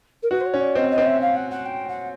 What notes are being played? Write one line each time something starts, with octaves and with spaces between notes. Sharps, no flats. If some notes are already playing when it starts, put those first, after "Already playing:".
A#4
F#4 B4
C5
C#5
C#4
D5
C4 D#5
D#5
C4
E5
F5
F#5
F#5
G5
F#5